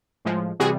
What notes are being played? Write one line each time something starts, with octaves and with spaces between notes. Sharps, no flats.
A2 F3 G#3
C3 E3 G3 F#4 G#4